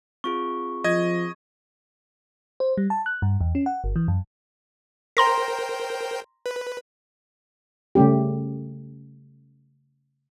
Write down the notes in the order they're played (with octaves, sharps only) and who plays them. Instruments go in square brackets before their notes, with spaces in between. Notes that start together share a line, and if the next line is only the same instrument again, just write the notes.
[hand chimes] C4 F4 G#4 [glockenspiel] C#6
[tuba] F3 [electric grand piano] D#5 G#6
[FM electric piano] C5
G3
A5
F#6
G2
E2
C#4
F#5
G1
E3
F#2
[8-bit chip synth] A#4 C5 G5 [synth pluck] A#5 C6 A#6
[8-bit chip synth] B4
[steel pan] C#3 G3 A3 C#4 G4